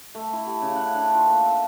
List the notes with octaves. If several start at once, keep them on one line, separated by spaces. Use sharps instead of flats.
A3
E4
G4
C#3
F#5
D4
F4
A#3
E5